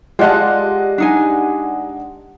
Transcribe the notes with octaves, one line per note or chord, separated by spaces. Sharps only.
G#3 F4 G4 D5 D#5 F#5 A5
D4 D#4 G#5